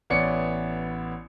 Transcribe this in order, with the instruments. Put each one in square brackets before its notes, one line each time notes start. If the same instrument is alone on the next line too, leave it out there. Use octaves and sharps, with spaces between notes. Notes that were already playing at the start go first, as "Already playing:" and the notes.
[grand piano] A1 B3 C#5 D5 C#7